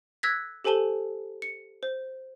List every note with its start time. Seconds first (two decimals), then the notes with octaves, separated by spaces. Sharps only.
0.23 E6 F#6 G#6 A#6 B6
0.64 G4 A4 C5 G#5 A5 G7
1.42 C#7
1.83 C5